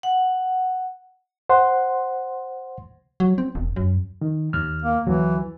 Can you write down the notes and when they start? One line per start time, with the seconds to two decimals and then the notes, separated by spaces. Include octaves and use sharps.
0.03 F#5
1.49 C5 F#5 C6
3.20 F#3
3.38 C4
3.55 E1
3.76 F#2
4.21 D#3
4.53 D#2 F6
4.82 A#3
5.06 D2 E3 F#3